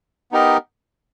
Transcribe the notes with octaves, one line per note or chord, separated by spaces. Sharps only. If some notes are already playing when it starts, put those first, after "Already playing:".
B3 D#4 G4 A#4 D#5